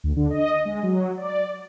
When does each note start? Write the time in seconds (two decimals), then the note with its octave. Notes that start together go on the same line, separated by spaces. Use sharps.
0.04 D2
0.16 D3
0.30 D#5
0.52 D#5
0.65 G#3
0.83 F#3
1.17 D5